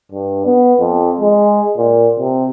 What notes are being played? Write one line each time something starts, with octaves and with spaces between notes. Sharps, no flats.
G2
B3
F2
G#3
A#2
C3